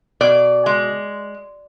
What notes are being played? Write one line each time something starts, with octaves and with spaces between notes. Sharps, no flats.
B2 D5
G#3